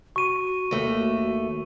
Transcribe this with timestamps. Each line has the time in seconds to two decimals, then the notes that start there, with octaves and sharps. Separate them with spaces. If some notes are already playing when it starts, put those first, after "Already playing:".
0.16 F#4 C#6 D#7
0.71 D#2 A3